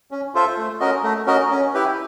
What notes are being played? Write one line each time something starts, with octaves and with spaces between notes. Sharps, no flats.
C#4
F4 A4 C5 E5
A3
C#4 F#4 A#4 D#5
A3
C#4 F#4 A#4 D#5
C#4
E4 G4 B4